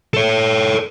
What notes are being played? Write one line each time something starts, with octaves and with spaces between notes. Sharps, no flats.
A4 C#5